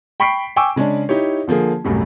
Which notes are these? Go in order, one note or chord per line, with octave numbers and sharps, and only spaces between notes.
G5 B5 C#6 B6 C7 D7
G5 G#5 C#6 D6 E6
C#3 G#3 C#4 D4
D#4 E4 G4 C#5
D3 F3 A#3 G#4
C2 F#2 A2 C3